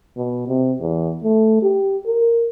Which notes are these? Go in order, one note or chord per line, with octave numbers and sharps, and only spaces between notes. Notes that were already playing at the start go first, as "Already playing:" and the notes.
B2
C3
E2
A3
G4
A#4